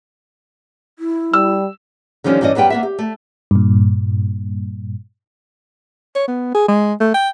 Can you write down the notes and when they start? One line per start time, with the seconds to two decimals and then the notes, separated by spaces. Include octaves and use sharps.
0.99 E4
1.34 G3 E6
2.24 D3 D#3 F3 G3 C#4
2.41 G2 E3 C#4 D5 D#5
2.55 F#2 G3 B3 B4 G5
2.70 A#3 B3 E5
2.83 G4
2.99 A3
3.51 G2 A#2
6.15 C#5
6.27 B3
6.54 G#4
6.68 G#3
7.00 A3
7.14 G5